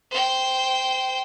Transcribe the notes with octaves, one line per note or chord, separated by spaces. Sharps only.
C5 G5